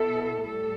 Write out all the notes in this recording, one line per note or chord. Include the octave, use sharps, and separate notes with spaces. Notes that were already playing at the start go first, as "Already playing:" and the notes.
Already playing: B2 B3 E4 A4
A2 G3 A4